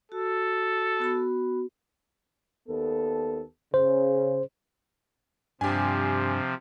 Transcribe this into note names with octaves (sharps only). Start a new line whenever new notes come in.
F#4 A4
B3 F#4 B5
D#2 B3 A4
C#3 C5
G2 C3 F3 D4 G4 G#5